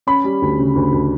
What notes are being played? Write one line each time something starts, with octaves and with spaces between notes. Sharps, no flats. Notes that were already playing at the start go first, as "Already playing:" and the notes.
C#4 B5
G3
D2
C#3
D2
D2